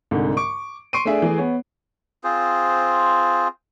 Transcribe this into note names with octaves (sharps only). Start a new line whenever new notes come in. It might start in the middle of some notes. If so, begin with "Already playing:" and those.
C2 G#2 D3
C#6 D6 D7
C6 C#6 C7 D7 D#7
A3 D4 G#4 E5
E3 A3 G#4
B3 C#5
C4 F4 G#4 C5